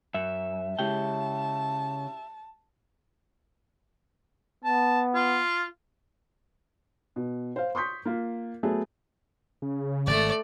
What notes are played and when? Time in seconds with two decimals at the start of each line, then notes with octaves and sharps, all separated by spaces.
0.14 F#2 E5
0.79 C#3 G#3 E4 G4 G5 A5
4.64 B3 A5
5.15 F4
7.16 B2
7.56 C5 F5
7.75 C6 C#6 D#6 G6 B6
8.05 A#3 F4
8.63 F#3 A3 B3 G#4
9.62 C#3
10.07 G#1 A3 D5